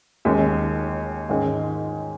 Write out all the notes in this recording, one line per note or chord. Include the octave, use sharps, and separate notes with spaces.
D#2 D#3 G#3 C#4
G#2 D#3 G#3 C#4